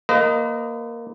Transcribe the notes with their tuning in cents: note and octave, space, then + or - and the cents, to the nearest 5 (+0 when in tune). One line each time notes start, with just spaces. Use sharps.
A#3 +0 B4 +40 D#5 +0